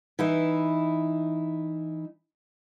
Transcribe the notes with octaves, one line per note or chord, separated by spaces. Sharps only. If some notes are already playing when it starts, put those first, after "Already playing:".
E3 D#4 E4